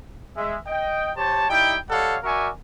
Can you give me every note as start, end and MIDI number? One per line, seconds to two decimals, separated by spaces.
0.37 0.56 56
0.37 0.56 76
0.67 1.10 75
0.67 1.10 79
1.16 1.45 67
1.16 1.45 72
1.16 1.45 73
1.16 1.45 81
1.49 1.75 55
1.49 1.75 63
1.49 1.75 64
1.49 1.75 79
1.90 2.17 55
1.90 2.17 69
1.90 2.17 73
1.90 2.17 75
1.90 2.17 77
1.90 2.17 78
2.24 2.50 66
2.24 2.50 70
2.24 2.50 74
2.24 2.50 76
2.24 2.50 80
2.24 2.50 85